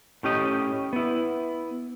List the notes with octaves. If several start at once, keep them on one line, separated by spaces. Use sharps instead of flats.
A2 C#4 G4 D#5
B3 E4